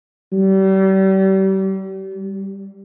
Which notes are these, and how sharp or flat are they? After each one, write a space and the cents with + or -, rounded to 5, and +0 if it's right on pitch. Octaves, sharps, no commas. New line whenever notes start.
G3 -35
G3 +0